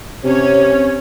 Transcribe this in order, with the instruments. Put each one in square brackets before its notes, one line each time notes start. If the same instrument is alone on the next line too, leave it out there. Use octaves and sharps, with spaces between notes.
[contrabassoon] C3 [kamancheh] C#4 C#5